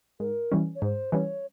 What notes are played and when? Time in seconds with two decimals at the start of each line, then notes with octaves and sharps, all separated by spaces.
0.20 G#2 A#4
0.52 E3 G3 C#4
0.75 C#5
0.82 G#2 C5
1.12 E3 G3 C#4 C#5